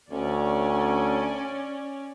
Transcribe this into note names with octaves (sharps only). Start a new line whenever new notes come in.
D2 C#4 D5